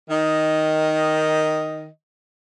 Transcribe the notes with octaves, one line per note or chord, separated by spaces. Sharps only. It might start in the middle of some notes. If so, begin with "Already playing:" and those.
D#3 D#5